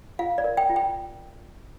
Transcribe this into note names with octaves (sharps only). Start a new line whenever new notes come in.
F4 F5
D5
A#4
G5
F4
G5